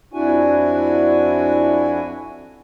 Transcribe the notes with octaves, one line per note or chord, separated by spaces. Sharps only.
F2 D4 E4 F#4 G#5